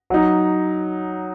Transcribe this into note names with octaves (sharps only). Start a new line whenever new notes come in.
F#3 D#4